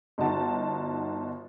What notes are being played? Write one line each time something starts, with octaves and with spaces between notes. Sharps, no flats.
G1 D#4 F#4 A5